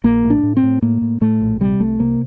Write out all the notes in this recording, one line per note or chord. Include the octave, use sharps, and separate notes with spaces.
A#1 A#3
A2
D4
A2
C4
A2
A2 A#3
A2
A2 A3
A#1
C3 G3
C2 A3
C3 A#3